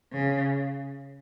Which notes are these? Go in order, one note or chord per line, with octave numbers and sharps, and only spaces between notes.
C#3